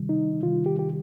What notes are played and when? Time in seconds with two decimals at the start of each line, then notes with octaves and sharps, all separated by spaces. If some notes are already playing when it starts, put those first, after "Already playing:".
Already playing: C3 D#3 G3
0.09 D#4
0.43 C3 D#3 G3 F4
0.66 G4
0.79 G4